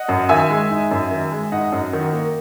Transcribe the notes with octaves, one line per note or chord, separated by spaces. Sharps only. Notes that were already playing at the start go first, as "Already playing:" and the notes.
Already playing: D#5 F#5
F#2
D#3 E5 G#5
G#3
D#4
F#2
D#3
G#3
D#4 D#5 F#5
F#2
D#3
A#3